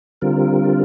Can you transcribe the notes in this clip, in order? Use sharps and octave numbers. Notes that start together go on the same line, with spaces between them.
D3 G3 C4 F4 A#4